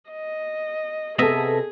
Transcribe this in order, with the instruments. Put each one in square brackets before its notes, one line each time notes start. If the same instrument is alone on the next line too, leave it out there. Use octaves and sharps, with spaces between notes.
[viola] D#5
[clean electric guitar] C3 D#5 E5 [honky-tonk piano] B3 A4 [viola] G#4